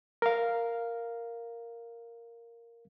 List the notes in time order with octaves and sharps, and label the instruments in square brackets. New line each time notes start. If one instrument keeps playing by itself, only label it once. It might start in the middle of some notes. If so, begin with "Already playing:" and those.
[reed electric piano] A#4 F5